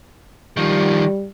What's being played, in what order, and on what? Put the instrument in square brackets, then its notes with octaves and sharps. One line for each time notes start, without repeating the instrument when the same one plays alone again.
[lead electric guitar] D#3 F3 [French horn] G3